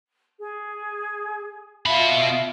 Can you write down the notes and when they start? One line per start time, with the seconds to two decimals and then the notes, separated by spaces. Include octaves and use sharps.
0.38 G#4
1.86 B2 F4 E5 B5